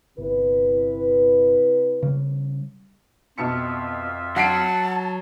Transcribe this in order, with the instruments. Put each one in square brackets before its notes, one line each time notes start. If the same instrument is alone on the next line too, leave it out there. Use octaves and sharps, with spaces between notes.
[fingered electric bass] G1 [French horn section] C3 E4 B4
[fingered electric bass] C#3 G3
[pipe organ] F2 F4 E5 [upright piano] B2 A5 C#7
[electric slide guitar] F#3 [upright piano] F#5 C7 D7 [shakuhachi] A5